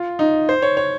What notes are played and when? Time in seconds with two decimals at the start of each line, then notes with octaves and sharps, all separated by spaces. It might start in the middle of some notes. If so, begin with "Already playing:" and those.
Already playing: F4
0.19 D#4
0.49 C5
0.62 C#5
0.77 C#5